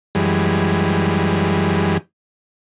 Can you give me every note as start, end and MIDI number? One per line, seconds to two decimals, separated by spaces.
0.15 1.98 42
0.15 1.98 52
0.15 1.98 55
0.15 1.98 56